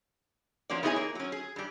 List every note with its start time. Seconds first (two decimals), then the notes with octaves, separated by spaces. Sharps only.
0.70 F3 A#3 C#4 F#4 D5
0.83 B3 D#4 E4 G#4 C#5 G#5
0.96 A#3
1.15 F#3 C#4
1.32 G#4
1.56 G2 G3